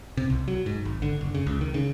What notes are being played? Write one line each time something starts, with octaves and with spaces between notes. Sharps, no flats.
C3
C2
F#3
G#2
G#1
D3
F#1
C#3
C#2
D#3
C#3